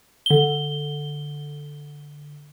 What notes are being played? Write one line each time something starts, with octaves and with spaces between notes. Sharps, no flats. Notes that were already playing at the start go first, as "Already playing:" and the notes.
D3 G7